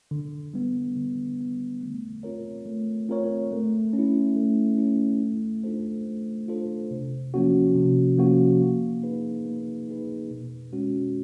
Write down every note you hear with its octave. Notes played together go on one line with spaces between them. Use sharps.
D3
G3 B3
D3
G3 B3
A3
C4 F4 A#4 C#5
A3
C4 F4 A#4 C#5
A3
C#4
E4
A3
C#4 E4
A3
D4 F4 A4 C5
A3
D4 F4 A4 C5
C3
F3 A#3 C#4 F#4
C3
F3 A#3 C#4 F#4
A#3
D#4 G#4 B4
A#3
D#4 G#4 B4
B2
G#3 C#4 F#4